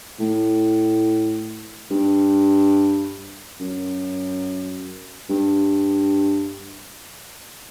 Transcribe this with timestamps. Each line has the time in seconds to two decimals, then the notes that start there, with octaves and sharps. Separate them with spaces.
0.20 A2
1.90 G2
3.60 F#2
5.29 G2